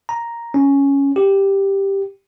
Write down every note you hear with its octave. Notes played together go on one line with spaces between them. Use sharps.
A#5
C#4
G4